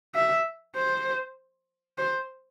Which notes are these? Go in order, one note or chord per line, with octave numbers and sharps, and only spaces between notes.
E5
C5
C5